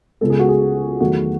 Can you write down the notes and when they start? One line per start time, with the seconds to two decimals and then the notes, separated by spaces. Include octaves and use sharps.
0.21 C#2 C#3 G#3 B3 A4
0.30 G#4
0.39 F#4
0.49 G#4
1.00 E2 D#3 F#3 A3 F#4